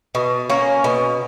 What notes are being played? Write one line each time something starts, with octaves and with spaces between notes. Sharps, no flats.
B2
A#3 C#4
B2